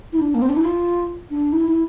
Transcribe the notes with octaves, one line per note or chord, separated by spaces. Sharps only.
E4
D4
A#3
C4
D4
E4
F4
D4
E4
E4